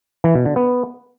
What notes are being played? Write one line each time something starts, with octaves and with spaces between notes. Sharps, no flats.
E3
B2
D3
B3